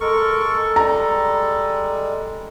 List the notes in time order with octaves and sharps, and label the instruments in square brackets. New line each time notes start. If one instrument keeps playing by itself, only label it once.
[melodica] G#3 A#4 C#6 [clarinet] A4
[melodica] G3 G#3 [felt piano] A#5